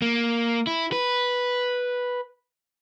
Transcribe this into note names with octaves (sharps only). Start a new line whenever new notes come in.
A#3
E4
B4